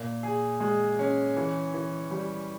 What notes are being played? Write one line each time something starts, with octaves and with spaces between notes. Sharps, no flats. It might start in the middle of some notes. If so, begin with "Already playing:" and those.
Already playing: A#2
G#4
G#3
C#4
E3
E3
G3